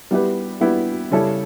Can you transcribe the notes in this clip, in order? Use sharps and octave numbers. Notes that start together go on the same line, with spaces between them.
G3 B3 E4 G4 B4
G3 B3 E4 G4 B4
C#3 G3 C#4 E4 A4